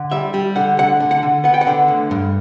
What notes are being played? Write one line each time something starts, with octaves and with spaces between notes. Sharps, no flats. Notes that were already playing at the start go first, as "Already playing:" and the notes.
Already playing: D3
G3 E5
G3
D3 F#5
D2 F#5
D3
F#5
D3
B3 F#5
G5
F#5
D3
D2
G2